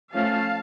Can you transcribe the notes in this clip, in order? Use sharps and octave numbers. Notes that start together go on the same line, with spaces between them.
F3 A3 C#4 F5 A5